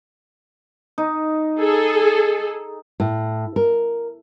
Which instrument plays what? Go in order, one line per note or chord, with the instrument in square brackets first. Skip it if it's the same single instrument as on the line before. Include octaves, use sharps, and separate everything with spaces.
[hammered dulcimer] D#4
[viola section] G#4 A4
[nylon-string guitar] A2
A#4